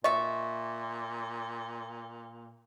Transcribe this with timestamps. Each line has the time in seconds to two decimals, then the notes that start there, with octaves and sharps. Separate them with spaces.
0.04 A#2 D#5 E5 C#6